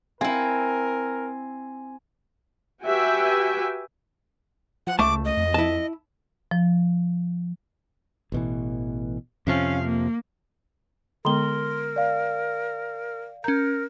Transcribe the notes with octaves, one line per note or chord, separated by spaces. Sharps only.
C4 E4 A#4 G#5
F#4 G4 B4 E5 G5 G#5
F3 F#5
C#2 A3 A5 D6
D#5
F2
E4 A5
F3
A1 B2 E3
F2 C3 F3 C#4 F5
A#3
D3 G#3 B3 A#4 C6 G7
D5 F5
C#4 A#4 A#5 G6